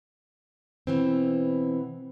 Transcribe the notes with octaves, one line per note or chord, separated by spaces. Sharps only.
B2 E3 C4